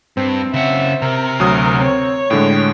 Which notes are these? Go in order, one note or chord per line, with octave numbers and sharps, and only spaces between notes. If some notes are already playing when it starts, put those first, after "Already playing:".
G2 C4
C#3 E5 F#5
C3 A#4
D2 F#3 D#6
C4 C#5
A2 D3 G#3 G5